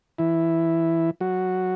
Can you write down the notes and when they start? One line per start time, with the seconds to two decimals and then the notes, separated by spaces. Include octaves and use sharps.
0.18 E3 E4
1.21 F#3 F#4